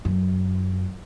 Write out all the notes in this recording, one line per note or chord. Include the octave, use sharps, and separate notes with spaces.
F#2